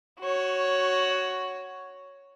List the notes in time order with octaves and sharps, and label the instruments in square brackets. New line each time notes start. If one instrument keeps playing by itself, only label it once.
[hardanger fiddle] F#4 C#5